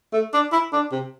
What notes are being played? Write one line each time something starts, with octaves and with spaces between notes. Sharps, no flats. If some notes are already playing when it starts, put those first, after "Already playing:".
A3
D4
E4
D4
C3